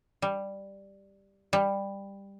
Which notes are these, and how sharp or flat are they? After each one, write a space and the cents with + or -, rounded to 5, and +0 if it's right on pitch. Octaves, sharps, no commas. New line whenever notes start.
G3 +5
G3 +15